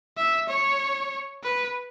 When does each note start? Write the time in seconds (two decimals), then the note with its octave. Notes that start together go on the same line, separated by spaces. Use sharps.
0.17 E5
0.49 C#5
1.44 B4